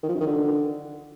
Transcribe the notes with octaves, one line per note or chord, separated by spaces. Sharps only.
D#3
F3
F#2
D#3
D3